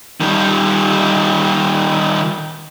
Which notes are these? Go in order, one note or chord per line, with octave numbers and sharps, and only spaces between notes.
D#3 G3